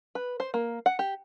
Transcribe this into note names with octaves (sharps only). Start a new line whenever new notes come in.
B4
C5
A#3
F#5
G4